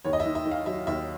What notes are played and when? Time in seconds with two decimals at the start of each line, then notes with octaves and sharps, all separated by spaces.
0.05 D#2 C#5
0.13 D#5
0.20 E5
0.25 D#3
0.35 E5
0.46 D#3
0.51 F5
0.66 F#3 E5
0.87 D#2 E5